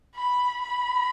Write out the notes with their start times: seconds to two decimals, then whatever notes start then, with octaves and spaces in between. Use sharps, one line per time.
0.16 B5
0.62 B5